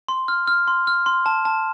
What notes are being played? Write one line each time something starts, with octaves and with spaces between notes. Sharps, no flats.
C6
F6
F6
C6
F6
C6
A5
A5